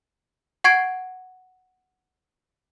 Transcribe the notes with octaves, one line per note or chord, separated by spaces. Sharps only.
F#5 C#6 G#6 C7 D7